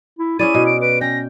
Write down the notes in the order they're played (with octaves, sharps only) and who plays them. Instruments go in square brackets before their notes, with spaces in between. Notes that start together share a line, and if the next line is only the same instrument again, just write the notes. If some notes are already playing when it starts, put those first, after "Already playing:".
[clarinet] E4
[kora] C#4 G#4 D5 [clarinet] E4 [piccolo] D#7
[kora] B2
[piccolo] D7
[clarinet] B4 [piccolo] D7
[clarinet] C#4 [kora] G5 [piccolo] A#6